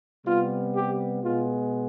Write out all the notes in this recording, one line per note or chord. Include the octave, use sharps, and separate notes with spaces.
C3 G3 B3 F4
G4
B2 G#3 B3 F4